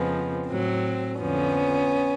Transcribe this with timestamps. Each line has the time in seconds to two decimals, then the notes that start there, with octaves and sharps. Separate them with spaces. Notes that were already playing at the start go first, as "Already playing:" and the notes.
Already playing: F2 C#3 F3 G#3 B3
0.48 A2 F#3 C4
1.18 F2 D3 F3 B3 C#4